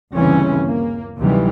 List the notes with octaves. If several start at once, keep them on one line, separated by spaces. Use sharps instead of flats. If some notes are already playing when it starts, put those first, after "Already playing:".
G1 D#2 C#3 E3 C4 C#4
A#3
D2 C3 D#3 E3 F#3 G3